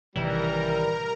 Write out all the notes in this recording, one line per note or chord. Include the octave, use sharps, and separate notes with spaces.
A1 C3 D#3 E3 G3 A#4 A#5